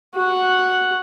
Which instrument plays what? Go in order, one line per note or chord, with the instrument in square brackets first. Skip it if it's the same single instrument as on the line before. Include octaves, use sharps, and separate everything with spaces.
[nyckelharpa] F#4 F#5